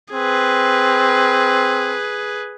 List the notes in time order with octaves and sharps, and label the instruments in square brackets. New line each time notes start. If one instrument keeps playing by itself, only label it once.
[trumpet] C4 [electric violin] G#4 B4